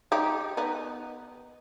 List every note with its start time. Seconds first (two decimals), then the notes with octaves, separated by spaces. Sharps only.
0.12 D#4 G4
0.57 B3 D#4